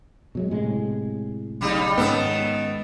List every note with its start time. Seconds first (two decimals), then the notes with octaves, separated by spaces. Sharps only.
0.35 B2 F#3 G#3
0.51 A2 C3 G#3
1.61 B1 C#3 G3 D#4
1.97 G#2 D#3 B3 C#4 A4